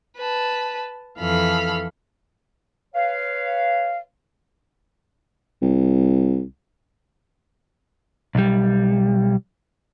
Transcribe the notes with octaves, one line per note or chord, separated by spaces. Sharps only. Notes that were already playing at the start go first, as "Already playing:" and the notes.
B4 A5
F2 E3 A4 F5 B5 F6
B4 C#5 F5
C2
B1 G3